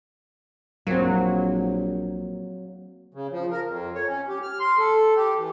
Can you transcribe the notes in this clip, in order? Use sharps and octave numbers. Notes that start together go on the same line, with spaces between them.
A#1 F#3 A#3 C4
C#3
F3
A#4
F2
C#5
C#4
G4
F6
C6
A4
G4
E3